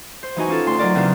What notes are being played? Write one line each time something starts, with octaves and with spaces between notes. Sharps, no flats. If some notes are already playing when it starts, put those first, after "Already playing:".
C5
E3 D#4 F#4 G#5
C#4 F4 A4
D2 C6
F#3 D#4 A#4 D5
E2 C#3 F#3 C4 D4 A#4